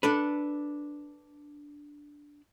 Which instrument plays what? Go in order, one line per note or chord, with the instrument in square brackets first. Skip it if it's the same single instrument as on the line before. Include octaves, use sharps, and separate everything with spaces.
[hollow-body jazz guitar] D4 A4 B4